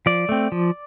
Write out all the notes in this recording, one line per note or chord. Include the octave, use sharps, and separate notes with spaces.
F3 D5
A3 C4
F3